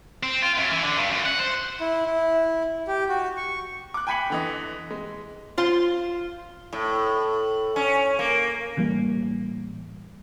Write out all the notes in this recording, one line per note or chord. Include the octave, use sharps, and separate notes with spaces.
C4
F4
F#2
E3
D3
G2
F#2
F#5
C5
E4
E4
G4
F#4
C#6
D6 F#6
G5 G#5 B5 B6 C#7 F#7
D3 E3 D#5
G#3
F4 C5
A2
C#4
A#3
A1 E3 G3 A#3